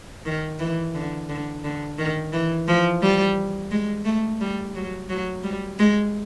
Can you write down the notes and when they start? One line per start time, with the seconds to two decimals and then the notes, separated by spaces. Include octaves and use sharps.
0.25 D#3
0.59 E3
0.94 D3
1.29 D3
1.64 D3
1.98 D#3
2.32 E3
2.67 F3
3.02 G3
3.71 G#3
4.05 A3
4.40 G3
4.75 F#3
5.09 F#3
5.43 G3
5.79 G#3